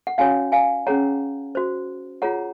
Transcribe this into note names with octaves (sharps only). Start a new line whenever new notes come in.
F#5
C#4 F#4 C#5 F5 G#5
F5 G#5
C#4 G#4 C#5 F#5 A#5
F#4 C5
F4 G#4 C#5 F#5 A#5